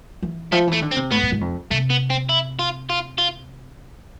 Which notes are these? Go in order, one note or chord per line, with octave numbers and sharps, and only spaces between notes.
E3
F3 A3
E3
A3
D3
C4
C3
A2 B3
A2
G#2
F2
C3 A3
B3
C4
E4
F4
F4
F4